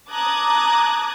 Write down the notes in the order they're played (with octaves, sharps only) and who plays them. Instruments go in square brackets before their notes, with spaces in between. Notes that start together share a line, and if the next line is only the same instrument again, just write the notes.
[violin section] A5 A#5 D6 D#6 F#6 G#6